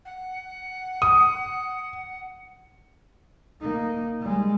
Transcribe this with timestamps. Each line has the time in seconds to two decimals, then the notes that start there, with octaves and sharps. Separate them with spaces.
0.05 F#5
1.02 D#6
3.61 A#3 D#4
4.20 G3 G#3